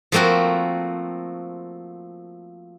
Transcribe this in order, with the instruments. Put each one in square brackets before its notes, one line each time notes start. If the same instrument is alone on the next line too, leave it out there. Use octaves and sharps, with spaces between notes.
[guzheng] F3 A3 A#3 C4 F#4